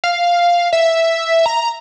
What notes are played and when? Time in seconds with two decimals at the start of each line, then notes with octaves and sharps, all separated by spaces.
0.04 F5
0.73 E5
1.46 A#5